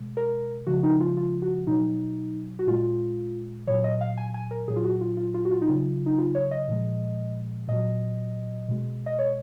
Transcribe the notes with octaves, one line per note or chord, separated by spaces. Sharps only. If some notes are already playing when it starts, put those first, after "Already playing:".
Already playing: B2 G#3
A#4
C#3 F3 G#3 F#4
D#4
F4
F4
F#4
B2 F#3 D#4
F#4
A#2 G#3 F4
A#2 F#3 C#5
D#5
F5
G#5
G#5
A#4
A#2 F#3 G#4
F4
F#4
F4
F4
F4
F#4
F4
D#4
C#3 F#3 F4
D#4
F4
C#5
D#5
A#2 F3 G#3
A#2 F#3 D#5
B2 G#3
D#5
C#5